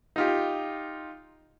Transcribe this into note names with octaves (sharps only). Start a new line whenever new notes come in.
D#4 F4 G4